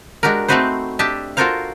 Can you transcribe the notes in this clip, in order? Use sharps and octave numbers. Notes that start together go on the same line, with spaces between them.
G#3 D4 F#4 G4 A#4
A3 C4 D#4 F#4 B4 C5
D4 G4 D#5 E5 A5
F4 F#4 A4 A#4 C5 F5